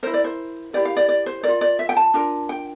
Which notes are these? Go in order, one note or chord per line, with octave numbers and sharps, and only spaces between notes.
E4 A#4 C5
D5
C5
E4 G4 A#4 D5
F5
D5
D5
C5
F4 A#4 D5
D5
E5
G5
A5
D4 F4 A#4
G5